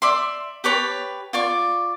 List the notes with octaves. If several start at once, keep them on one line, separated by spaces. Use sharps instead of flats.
D5 E5 C6
G4 B4 C#5 A5
F4 D5 C#6